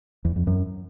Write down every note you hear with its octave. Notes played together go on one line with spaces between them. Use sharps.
E2
F2
F#2